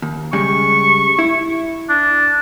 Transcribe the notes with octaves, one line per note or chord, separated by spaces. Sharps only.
D#2
C#3 G3 G#3 C#6
E4
D4